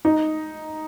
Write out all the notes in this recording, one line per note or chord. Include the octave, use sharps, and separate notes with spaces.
D#4